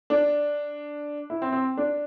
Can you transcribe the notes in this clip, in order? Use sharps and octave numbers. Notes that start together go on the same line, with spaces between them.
D4
E4
C4
C4
D4